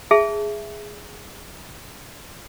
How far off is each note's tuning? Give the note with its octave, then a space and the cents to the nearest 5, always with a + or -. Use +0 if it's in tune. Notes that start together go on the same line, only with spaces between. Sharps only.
G#4 +0 E5 +5 A5 +0